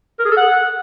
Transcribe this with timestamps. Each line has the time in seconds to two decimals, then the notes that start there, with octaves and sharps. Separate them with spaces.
0.19 A#4
0.25 G#4
0.31 A4
0.37 F#5